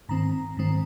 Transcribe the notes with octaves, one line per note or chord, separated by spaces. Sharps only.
G#2 D#3 C4 A#5
G#2 D#3 C4